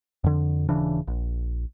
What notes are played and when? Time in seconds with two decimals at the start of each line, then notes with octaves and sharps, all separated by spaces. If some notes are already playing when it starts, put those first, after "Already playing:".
0.24 F2 D3
0.69 D#1 C#3 E3 D4
1.07 A#1